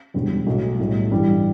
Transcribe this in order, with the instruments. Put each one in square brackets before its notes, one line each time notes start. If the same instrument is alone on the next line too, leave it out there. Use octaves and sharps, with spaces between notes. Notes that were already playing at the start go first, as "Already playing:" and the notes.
[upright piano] E1 E2 D3 G3
B1 B2 F#3 A3
B1 A2 G3
G2 E3 G3 D4